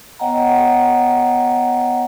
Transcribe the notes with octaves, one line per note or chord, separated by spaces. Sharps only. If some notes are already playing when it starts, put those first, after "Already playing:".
B3 C#5 D#5 F#5 G5 A#5